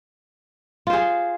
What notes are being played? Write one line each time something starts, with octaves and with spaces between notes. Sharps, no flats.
F4 G#4 C5